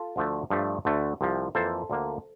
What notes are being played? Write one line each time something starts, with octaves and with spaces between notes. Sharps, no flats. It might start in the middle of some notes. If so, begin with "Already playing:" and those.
Already playing: F4 A4
D2 D3 F3 A3
G2 F3 A3
D2 D3 A3
C2 C3 F3
F2 E3 A#3 A4 C5
D2 D3 F3 A#3